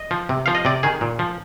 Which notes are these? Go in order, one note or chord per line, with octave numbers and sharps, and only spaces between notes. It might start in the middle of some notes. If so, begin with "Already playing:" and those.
Already playing: D#5
F3
C3
F3 F5
D#5
C3 D5
D#3 G#4
A#2
F3